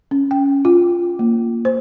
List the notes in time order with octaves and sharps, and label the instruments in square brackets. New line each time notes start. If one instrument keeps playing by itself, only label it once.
[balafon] C#4
G5
F4
A#3
C5